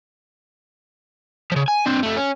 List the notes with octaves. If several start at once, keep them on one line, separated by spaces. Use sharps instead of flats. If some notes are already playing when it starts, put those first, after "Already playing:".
C#3 F3
G#5
C4 D4
F2 A3
C#4